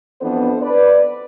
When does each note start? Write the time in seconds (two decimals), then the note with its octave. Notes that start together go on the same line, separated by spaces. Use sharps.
0.21 F2 E3 B3 D4 A4 C5
0.62 B4 D5